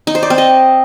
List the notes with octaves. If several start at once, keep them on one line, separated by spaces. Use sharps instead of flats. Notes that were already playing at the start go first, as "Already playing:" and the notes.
D#4
C5
D5
C4
D#5